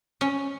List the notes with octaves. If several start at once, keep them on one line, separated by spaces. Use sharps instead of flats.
C#4